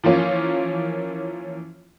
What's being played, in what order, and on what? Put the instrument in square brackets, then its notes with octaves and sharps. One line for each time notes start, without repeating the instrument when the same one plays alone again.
[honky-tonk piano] E3 F3 A#3 C#4 F4